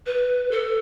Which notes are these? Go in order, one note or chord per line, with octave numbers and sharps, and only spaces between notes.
B4
A4